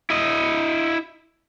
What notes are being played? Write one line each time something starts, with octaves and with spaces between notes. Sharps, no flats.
E4 D#5